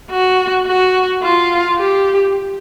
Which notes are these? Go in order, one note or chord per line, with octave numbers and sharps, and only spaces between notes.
F#4
F#4
F4
G4